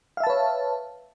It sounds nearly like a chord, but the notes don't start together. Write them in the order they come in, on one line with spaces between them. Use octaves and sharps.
F5 E5 A5 B4 C#5